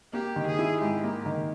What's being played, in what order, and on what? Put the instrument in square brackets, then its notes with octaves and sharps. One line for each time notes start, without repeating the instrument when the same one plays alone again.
[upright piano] A#3 [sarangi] G4
[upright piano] D#3
[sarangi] G#4
[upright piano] E4
[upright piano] G#2 [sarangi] G4
[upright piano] A#3
D#3